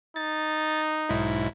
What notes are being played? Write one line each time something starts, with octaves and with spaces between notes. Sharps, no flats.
D#4 A6
B1 G#2 E4